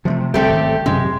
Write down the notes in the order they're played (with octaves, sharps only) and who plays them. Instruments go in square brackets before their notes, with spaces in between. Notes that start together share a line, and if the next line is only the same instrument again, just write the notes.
[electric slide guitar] C3 [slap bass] F3 G3 A3
[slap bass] C2 D3 [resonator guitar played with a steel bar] A3 C4 A4 [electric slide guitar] G4 G5
[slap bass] G#1 C#3
[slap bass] F#2 C3 C4 [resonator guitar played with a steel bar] G#3